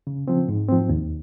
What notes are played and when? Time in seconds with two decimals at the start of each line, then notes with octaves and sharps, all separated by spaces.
0.07 C#3
0.28 F3 C4
0.48 G#2
0.69 F3 C4
0.89 D#2